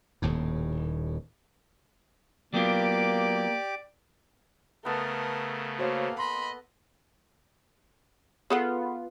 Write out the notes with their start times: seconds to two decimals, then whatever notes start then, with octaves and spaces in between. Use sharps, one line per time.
0.22 D#1 D#2 A2
2.54 F#3 A#3 B3 F4 G4 D5 D6
4.85 C#3 A3 B3 A4 A#4
5.79 A#3 F#4 C5 C#5
6.19 D#5 B5 C6
8.50 B3 F4 G#4 A4 F#5